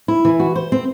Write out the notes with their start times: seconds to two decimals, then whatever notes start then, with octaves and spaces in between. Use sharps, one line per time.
0.08 E4
0.25 E3
0.40 F#4
0.56 C5
0.72 C4